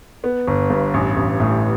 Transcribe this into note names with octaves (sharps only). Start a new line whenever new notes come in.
B3
G1
G2
A1
A1
A2